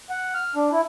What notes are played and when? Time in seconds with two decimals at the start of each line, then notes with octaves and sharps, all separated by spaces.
0.10 F#5
0.35 F6
0.56 D4
0.72 E4